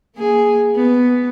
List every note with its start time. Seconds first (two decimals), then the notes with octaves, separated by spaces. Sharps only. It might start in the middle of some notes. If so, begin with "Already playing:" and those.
0.16 A#3 G#4
0.75 B3